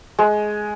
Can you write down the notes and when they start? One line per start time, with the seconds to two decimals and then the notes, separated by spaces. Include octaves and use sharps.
0.19 G#3